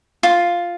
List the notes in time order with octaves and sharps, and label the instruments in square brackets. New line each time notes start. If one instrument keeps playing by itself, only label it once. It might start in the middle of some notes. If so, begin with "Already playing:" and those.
[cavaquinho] F4